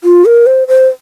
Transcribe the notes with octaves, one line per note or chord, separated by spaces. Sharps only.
F4
A#4
C5
C5